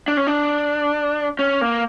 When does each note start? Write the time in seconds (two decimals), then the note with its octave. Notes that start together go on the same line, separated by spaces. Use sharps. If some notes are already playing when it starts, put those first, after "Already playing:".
0.08 D4
0.17 C#4
0.27 D4
1.39 C#4
1.61 A#3